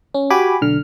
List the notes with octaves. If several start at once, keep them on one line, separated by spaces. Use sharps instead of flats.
C#4
F#4 G4 G#5 B5 D6
B1 D3 F6